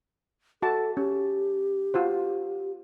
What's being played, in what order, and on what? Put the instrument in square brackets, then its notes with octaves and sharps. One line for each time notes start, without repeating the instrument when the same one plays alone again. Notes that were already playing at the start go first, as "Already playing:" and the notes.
[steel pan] F#4 E5 A5 [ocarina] A4
[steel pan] C#4 [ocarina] G4
[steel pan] F4 F#4 C5